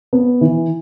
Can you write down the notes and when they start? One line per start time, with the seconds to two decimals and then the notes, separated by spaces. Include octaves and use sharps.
0.13 B3
0.41 E3